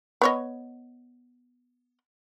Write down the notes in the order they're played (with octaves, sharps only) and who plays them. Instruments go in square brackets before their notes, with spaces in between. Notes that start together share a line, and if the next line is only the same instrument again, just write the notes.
[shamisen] B3 C#5 D#5